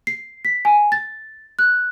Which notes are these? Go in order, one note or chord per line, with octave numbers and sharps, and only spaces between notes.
C7
B6
G#5
A6
F#6